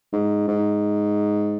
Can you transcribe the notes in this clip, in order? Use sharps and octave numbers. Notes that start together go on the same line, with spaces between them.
G#2
G#2